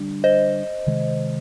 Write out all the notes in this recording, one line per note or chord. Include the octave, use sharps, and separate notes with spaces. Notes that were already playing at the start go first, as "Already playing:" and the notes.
Already playing: D3 G3 D4
C5 D#5
C3 D#3 G#3